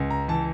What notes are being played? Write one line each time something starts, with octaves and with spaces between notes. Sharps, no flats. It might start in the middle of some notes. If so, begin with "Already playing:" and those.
Already playing: C#2
A#5
E3 A5